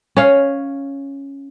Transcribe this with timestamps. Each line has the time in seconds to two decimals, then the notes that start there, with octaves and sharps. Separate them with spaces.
0.17 C#4 F5